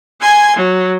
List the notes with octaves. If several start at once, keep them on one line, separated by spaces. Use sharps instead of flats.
G#5 C6 G#6
F#3